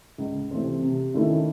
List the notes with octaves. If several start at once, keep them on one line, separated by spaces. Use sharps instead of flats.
C#2
C3 E3 A3 C4
C3
D#3 A3 C#4 E4